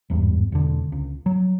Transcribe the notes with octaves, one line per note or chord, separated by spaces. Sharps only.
G#1 E2 G2
E1 D3
C#2
F#3